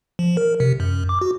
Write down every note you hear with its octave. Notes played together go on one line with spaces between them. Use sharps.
F3
A#4
C3
F#2
D6
F#4